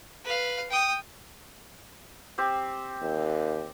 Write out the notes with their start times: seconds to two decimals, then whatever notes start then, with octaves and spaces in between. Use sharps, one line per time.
0.24 B4 F5
0.70 G5 D#6
2.38 C4 G4 C5
3.02 D#2